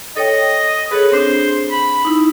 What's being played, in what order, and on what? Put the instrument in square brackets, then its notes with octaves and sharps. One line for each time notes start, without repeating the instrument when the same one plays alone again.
[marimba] A4 C#5 G5 [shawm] D#5
[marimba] G#4 A4 C#5 [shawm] B4
[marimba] C4 D4 [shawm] C5
[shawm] B5
[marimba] D#4 E4